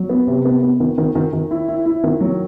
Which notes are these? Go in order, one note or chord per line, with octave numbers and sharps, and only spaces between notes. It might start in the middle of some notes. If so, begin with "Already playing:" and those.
Already playing: F#3
B3
C3
B3
B3
D#3
D#3
D#3
D#3
E4
E4
E4
D#3
F#3